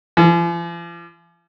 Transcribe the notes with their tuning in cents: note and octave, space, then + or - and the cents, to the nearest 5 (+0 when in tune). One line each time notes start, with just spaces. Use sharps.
F3 -45